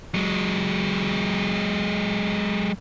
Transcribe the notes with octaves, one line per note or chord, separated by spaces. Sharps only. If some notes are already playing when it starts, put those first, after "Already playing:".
F#3 G#3